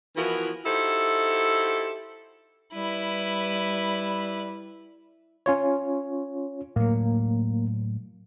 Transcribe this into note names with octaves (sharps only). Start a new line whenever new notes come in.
E3 F3 B3 E4 F#4 A#4
D#4 E4 F#4 G4 A4 C5
G3 E4 B4
C#4 F4 C#5
A2 F#3 A#3